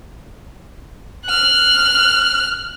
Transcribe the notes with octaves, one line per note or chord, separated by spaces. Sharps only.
F6 F#6